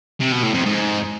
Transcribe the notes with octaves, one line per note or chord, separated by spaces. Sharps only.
C3
B2
A2
F2
G#2